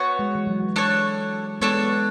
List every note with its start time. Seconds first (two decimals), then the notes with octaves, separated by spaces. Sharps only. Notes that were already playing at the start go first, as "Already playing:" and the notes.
Already playing: B3 F#4 C#5
0.19 G#3
0.35 E3
0.47 F#3
0.76 D4 A4 C#5
1.61 G#3 B3 D4 A4 C#5